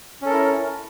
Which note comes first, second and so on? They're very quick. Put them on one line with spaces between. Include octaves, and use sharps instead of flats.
C#4 A4 A#4 E4